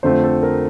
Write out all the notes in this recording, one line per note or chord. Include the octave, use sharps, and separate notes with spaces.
F2 D3 F3 A3 C4 C5
A4
A#4